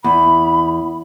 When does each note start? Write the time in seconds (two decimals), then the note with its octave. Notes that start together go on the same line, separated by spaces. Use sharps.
0.04 E2 B5